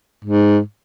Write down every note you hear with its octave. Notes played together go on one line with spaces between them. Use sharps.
G#2